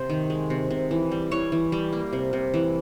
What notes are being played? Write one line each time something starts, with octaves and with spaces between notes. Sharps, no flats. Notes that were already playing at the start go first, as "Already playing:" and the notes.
Already playing: C3 C5
D#3
G#3
C3
C3
E3
G3
E3 C#5
E3
G3
A#3
C3
C3
E3